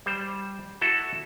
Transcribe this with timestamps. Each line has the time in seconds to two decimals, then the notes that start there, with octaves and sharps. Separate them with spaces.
0.06 G3 C5
0.81 E4 F#4 A4